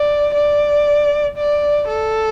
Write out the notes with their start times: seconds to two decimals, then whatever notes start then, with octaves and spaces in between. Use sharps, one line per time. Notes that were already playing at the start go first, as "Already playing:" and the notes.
Already playing: D5
0.34 D5
1.38 D5
1.88 A4